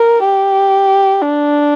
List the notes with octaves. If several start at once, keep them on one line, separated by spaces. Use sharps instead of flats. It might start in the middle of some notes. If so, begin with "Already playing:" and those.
Already playing: A#4
G4
D4